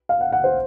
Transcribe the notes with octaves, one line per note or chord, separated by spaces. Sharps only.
F5
F#5
F#5
C5